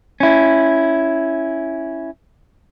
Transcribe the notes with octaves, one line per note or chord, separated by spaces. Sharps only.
C#4 E4